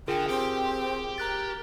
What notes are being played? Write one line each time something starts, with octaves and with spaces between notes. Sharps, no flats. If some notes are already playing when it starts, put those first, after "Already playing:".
D3 F4 G#4 A#4 G5
C4 G4
A#4 A#5 F#6 A6